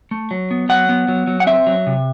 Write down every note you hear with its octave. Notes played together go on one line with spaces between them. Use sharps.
A3
F#3
B3
F#3 F#5
B3
F#3
F#3
F#5
C4 E5
F#3
C3